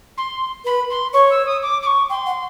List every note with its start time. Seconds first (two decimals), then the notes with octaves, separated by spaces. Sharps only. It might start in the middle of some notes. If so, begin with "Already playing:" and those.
0.17 C6
0.65 B4 B5
0.90 C6
1.13 C#5 C#6
1.30 E6
1.45 D#6
1.62 D6
1.82 D6
1.86 C#6
2.10 G5 C6
2.26 F#5